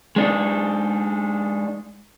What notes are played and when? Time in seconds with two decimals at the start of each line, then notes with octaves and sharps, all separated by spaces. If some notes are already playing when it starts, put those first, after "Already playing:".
0.16 G#3 D4 D#4